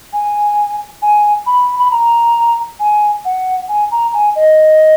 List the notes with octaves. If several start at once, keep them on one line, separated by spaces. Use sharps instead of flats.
G#5
G#5
B5
B5
A#5
G#5
F#5
G#5
A#5
G#5
D#5